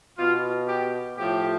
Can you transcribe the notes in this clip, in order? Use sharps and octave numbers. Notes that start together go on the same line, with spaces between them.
B2 F4
G4
A2 F3 G4